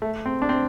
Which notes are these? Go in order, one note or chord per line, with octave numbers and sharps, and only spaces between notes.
A3
C4
D4
C4